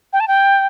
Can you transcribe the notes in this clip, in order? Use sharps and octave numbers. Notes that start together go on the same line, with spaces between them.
G5
A5
G5